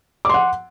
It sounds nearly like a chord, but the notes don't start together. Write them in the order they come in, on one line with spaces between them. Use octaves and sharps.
D6 C6 F#5